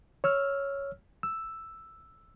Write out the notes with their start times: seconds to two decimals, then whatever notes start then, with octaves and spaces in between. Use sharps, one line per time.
0.24 C#5 E6 F6
1.23 E6